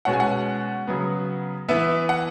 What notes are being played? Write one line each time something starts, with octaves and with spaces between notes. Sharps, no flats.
B2 G#3 C#4 F#5
G#5
F#5
C#3 F#3 B3
E3 B3 E5
F#5